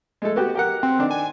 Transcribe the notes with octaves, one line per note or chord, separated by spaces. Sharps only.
G#3 A3 A4
B3 F#4 G4
G4 A#4 F#5
C4
D#3 D4
G#5